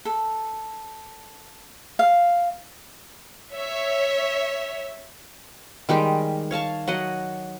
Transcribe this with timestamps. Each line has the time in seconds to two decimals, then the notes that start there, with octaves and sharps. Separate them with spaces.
0.05 A4
1.99 F5
3.52 C#5 E5
5.89 D#3 G3 G#3 G4
6.51 C#5 F5 A5 C#6
6.88 F#3 D#5 F#5